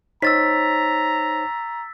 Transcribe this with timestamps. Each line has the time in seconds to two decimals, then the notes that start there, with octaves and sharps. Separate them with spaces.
0.22 D#4 C5 C#5 A#5 E6 A6 B6